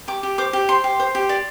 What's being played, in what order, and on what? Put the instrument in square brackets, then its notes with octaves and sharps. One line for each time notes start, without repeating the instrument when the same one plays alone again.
[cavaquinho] G4 D6
G4
C5 D6
G4
C5 C6
G4
C5
G4
D5